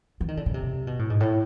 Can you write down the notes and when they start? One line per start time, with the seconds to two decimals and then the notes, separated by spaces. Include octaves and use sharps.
0.21 E3
0.28 D#3
0.37 D3
0.46 C#3
0.54 C3
0.87 B2
0.99 A2
1.10 G#2
1.20 A2